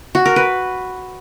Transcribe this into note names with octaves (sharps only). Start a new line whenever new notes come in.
F#4
A#4
B4